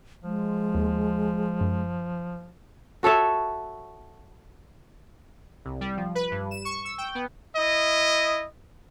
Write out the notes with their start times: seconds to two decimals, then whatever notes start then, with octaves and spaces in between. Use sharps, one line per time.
0.24 F3 G#3
0.74 D#2
1.61 F#2
3.03 F#4 A4 C#5 E5
5.65 C2
5.81 G3
5.97 F3
6.15 B4
6.31 G2
6.51 E7
6.65 C#6
6.85 E6
6.98 G5
7.15 B3
7.56 E4 D#5